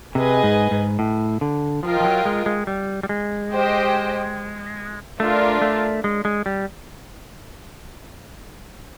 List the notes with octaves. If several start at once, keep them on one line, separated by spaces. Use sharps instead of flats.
C3 G#4 B4 D#5 G#5
G#2
G#2
A2
D3
F3 F4 A#4 D#5 G5
F3
F#3
G#3
G#3
G3
G3
G#3
G4 C5 D#5 G5
A3 D4 F4 A#4
A3
G#3
G#3
G3